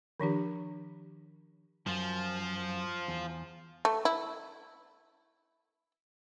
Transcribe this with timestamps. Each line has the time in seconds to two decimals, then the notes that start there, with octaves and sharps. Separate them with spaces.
0.20 D#3 F3 D4 G4
1.86 F#2 F3 F4
3.08 E2
3.85 A3
4.05 E4